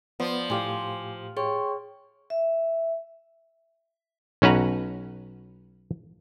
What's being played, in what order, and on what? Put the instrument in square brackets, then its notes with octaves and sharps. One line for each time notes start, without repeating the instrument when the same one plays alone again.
[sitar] F3 [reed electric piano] B3 [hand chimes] D5
[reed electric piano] A2 G4 F5 [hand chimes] G#5 C6 D6
[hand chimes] G#4 C#5 [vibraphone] G5 C6 C#6
[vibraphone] E5
[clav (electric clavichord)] B1 C#4 F#4 B4 A#5